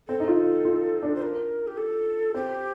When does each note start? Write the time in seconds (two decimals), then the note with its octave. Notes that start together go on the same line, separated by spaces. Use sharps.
0.08 C4 A4
0.20 D#4
0.28 F4
0.65 F4
1.03 D4
1.15 C5
1.22 A#4
1.67 G4
1.77 A4
2.34 C4 G4